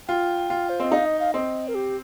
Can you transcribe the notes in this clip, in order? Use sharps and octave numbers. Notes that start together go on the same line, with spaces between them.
F4 G5
F4
C5
C4 D#5
D#4 F5
D#5
F5
C4 D#5
A#4
G4